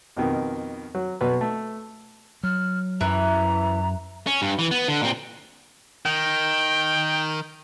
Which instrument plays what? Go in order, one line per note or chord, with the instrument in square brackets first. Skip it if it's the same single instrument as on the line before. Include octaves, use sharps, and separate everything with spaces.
[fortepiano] F2 B2 D#3
F#3
B1 B2 B4
A3
[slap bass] F#3 [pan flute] F6
[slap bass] F#2 [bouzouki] E3 [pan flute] A#5
[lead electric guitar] C#4
G2
E3
B3
D3
A#2 C4
[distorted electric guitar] D#3 [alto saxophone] G5